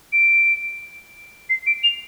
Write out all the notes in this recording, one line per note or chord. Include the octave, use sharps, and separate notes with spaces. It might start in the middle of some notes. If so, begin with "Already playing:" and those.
D7
C7
D7
F7